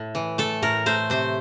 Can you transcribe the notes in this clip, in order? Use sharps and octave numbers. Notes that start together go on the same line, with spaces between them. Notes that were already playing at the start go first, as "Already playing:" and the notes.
Already playing: A2
E3
A3 A4
A2 A#4
A3 C5
C3 C5